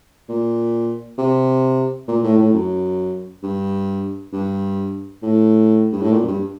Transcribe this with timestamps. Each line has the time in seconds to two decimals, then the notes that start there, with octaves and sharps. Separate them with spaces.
0.29 A#2
1.18 C3
2.08 A#2
2.24 A2
2.38 A2
2.53 F#2
3.43 G2
4.33 G2
5.23 A2
5.92 G2
6.02 A2
6.12 A#2
6.23 F#2
6.27 G2